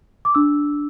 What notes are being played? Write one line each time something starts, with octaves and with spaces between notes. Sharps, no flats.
D6
D4 E6